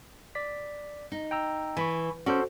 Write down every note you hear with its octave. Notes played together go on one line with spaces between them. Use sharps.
D5 B6
D#4
G5 A#5 E6
E3 G#5 B5 C#6
C#4 F#4 A4 C5 D5